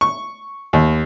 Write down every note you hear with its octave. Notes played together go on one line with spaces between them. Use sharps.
C#6
D#2